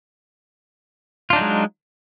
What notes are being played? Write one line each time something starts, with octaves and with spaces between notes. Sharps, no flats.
F#3 G#3 D4 D#4 F4